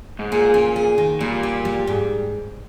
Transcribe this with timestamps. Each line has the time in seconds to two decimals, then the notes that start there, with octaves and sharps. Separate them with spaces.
0.19 G#2
0.32 A#2 G#4
0.54 C#4
0.76 G#4
0.98 D#3
1.21 A#2 G3
1.43 G4
1.65 G3
1.87 G#2